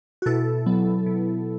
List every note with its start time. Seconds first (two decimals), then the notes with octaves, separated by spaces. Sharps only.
0.22 F#4
0.26 B2 E4 A4
0.66 F#3 B3
1.06 B2